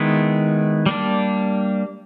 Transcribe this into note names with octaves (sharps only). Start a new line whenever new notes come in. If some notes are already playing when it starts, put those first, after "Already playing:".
Already playing: D#3 G#3 B3 E4
G3 A#3 D4